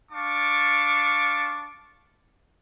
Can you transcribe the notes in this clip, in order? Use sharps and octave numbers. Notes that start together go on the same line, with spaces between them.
D4 F5 A5 C#6 D6